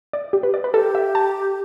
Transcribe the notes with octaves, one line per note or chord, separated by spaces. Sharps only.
D5
G4
B4
D5
B4
G4 A4
E5
A5